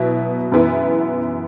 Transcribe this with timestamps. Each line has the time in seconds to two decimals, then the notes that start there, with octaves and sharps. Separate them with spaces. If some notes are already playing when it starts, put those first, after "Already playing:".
Already playing: B2 F#3 B3 E4
0.52 F#2 E3 B3 E4